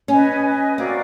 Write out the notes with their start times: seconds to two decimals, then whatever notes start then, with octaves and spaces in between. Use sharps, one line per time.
0.08 C#4 B4 D#5 G#5
0.44 B4 D#5 G#5
0.78 C4 F#4 A#4 D5 F5